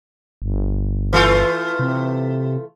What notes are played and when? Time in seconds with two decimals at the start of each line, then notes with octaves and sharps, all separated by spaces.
0.42 G1
1.13 E3 A3 F4
1.79 C3